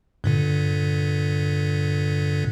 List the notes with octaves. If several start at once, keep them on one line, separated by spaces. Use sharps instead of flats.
G2 A#2 D3